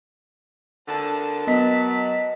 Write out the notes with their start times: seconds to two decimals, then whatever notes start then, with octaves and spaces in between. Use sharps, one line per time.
0.88 D3 A#4 A5
1.47 F#3 B3 D#5 B6